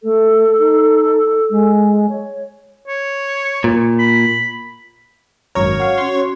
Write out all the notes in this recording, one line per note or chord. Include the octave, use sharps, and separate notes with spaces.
A3 A4
D#4
G#3
C#5
C#5
A#2
B5
G#1 F#2 A#4 C#5 C#6
F#4 F5 F#5
C#4 F#4 C6